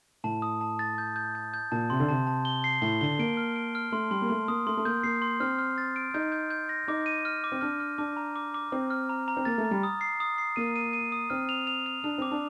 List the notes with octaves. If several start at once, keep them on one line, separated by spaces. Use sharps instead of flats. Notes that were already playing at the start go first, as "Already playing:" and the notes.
A2 A5
D#6
A5
A6
G6
G6
G6
G6
A#2 A5
C3 C6
D3
C3 A5
A5
G7
C7
A2 G7
D3 G7
A#3 D7
F6
D7
F6
A3 C6
G3 C6
A#3
A3 C6
A#3 D#6
A3 C6
A3
A#3 G6
A#3 C7
C6
C4 F6
F6
A6
D7
D#4 G6
G6
G6
A#6
D#4 D6
D#7
F6
D6
C4
D4 F6
F6
D4 D6
A#5
D6
D6
C4 D6
F6
A#5
A#5
C4
A#3 A6
A3
A#5
G3
D#6
C7
D#6
C7
A#3 D#7
D#7
D#7
D#6
C4 F6
F7
F7
F7
D4 F7
C4 D6
D4